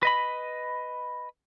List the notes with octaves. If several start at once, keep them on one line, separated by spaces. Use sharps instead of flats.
B4 D#5 B5